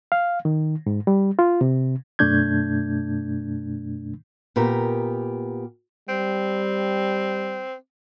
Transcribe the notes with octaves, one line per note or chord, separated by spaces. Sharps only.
F5
D#3
G#2
G3
F4
C3
F#2 B2 A3 D4 G6 G#6
A#2 B3 G4 A#4
G3 C4